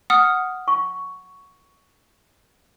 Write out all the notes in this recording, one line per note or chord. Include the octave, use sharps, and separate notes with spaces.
F#5 D#6 F6
C#6